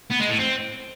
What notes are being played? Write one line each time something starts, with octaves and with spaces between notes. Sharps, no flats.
B3
G#3
A2
C4